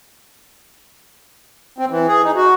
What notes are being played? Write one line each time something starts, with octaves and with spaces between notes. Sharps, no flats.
C4
E3
G#4
D#4
F#4